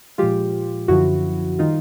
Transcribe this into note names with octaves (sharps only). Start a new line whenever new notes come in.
A#2 F3 G#3 F4 G4
F#2 D3 F3 E4 F#4
D#3 G3 D#4 F4